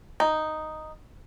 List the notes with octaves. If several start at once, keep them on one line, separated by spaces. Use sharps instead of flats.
D#4